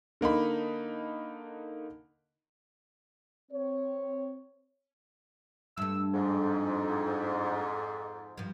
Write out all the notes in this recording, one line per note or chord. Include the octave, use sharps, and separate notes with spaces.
D3 A#3 D#4 B5
C4 C#5
G2 A3 E6
F2 G#2
G2 F3